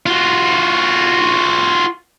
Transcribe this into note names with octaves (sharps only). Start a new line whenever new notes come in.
F4 F#4